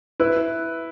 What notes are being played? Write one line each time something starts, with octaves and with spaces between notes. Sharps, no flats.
E4 B4